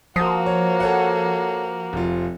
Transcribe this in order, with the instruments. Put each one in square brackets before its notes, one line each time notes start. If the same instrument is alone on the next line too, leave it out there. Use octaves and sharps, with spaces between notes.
[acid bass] F3 [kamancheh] A#3 F#4 [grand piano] D#6
[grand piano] C#5
A4 C#5 F#5
F1 F4